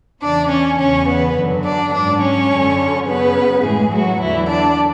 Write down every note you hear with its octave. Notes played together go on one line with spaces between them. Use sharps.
E2 C#3 E3 D4 D5
C#4 C#5
E2 C#3 E3 C#4 C#5
B3 B4
F#2 D3 F#3
D4 D5
G#2 F#3 D4 D5
C#4 C#5
F#2 D3 F#3
F#2 C#3 F#3 B3 B4
A2 E3 G#3 G#4
F#3 F#4
E2 D3 E3 F#3 E4
D4 D5